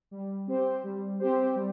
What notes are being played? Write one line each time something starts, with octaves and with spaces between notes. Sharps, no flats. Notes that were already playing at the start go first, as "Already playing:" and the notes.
G3
C4 G4 C5
G3
C4 G4 C5
G3